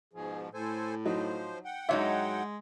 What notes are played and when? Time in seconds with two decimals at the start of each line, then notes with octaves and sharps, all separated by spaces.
0.14 G#2 B2 F3 G#4
0.54 A2 A4 C5 G#5
1.05 F3 F#3 D#4 C5
1.65 F#5 G5
1.89 G#2 F#3 G#3 D#4 E4 C#5 E5